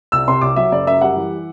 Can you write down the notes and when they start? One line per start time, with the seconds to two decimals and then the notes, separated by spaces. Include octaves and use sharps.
0.12 C2 E6
0.28 C3 C6
0.42 C2 D6
0.56 F#3 E5
0.71 F#1 D5
0.87 F#2 E5
1.01 G3 F#5
1.16 E3